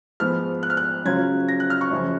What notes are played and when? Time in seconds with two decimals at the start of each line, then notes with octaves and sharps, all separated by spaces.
0.20 G#2 F3 B3 F6
0.63 F#6
0.70 F6
0.77 F#6
1.05 C#3 F#3 C#4 F4 G#6
1.48 A#6
1.60 F#6
1.70 F6
1.81 C#6
1.91 F#2 C#3 F3